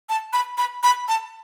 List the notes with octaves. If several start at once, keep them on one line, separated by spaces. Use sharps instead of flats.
A5
B5
B5
B5
A5